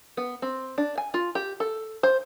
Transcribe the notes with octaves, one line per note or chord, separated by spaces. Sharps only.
B3
C4
D4
G#5
F4
G4
A4
C5